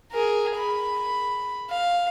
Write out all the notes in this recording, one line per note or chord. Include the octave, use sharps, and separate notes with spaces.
G#4 A#4
B5
F5